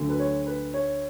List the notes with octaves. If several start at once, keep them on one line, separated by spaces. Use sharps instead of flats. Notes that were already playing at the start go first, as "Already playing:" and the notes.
Already playing: D2 D3 F#3
B4
C#5
B4
C#5